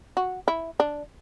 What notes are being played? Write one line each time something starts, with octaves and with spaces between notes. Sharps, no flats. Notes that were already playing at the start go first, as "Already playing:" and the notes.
F#4
E4
D4